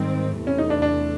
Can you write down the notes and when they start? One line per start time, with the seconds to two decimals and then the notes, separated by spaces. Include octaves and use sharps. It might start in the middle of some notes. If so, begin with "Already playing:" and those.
Already playing: G#2 D#3 G3 C4
0.36 E2 C3 E3 A3
0.47 C#4
0.58 D#4
0.70 D4
0.82 D4